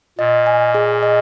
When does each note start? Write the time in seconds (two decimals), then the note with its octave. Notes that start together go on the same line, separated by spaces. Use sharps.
0.19 A#2 D#5
0.46 G#5
0.75 G#4
1.02 D#5